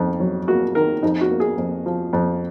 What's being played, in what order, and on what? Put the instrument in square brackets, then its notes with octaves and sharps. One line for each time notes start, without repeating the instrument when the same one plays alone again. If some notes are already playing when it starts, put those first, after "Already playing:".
Already playing: [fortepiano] F2 D#3
F#3
A#3 F#4
D#3 A#4
F2 D#4
F#4
A#3
G#4
F2
F3
F2